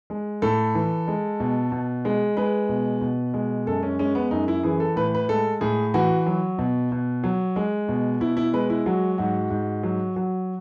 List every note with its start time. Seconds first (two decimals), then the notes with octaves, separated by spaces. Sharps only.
0.10 G#3
0.42 A2 A4
0.75 E3
1.07 G#3
1.40 B2
1.72 B2
2.05 G#3
2.37 G#3 B4
2.69 B2
3.01 B2
3.34 G#3
3.67 F#2 A4
3.83 C#4
3.99 G#3 C#4
4.15 B3
4.31 F#2 D#4
4.48 E4
4.63 E3 G#4
4.80 A4
4.96 A2 B4
5.15 B4
5.29 G#3 A4
5.61 A2 G#4
5.94 E3 F#4
6.26 F#3
6.59 B2
6.92 B2
7.24 F#3
7.56 G#3
7.89 B2
8.20 B2 E4
8.37 E4
8.53 G#3 B4
8.70 E4
8.86 F#3 F#4
9.18 G#2 F#4
9.50 G#2
9.83 F#3
10.16 F#3